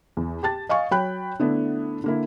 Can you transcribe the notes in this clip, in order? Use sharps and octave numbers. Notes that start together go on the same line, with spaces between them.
E2
G4 A5 A6
D#5 F5 G#5 C#6
F#3 C#5 G5 B5 F#6
D3 A3 B3 D4 E4
D3 A#3 E4